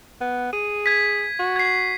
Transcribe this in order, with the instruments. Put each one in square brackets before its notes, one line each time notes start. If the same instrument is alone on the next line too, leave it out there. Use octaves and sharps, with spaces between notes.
[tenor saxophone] B3
[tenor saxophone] G#4 [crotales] D#7
[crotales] G#6 B6
[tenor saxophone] F#4
[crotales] G#6 C7